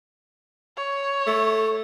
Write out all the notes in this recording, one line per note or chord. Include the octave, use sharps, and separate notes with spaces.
C#5
A3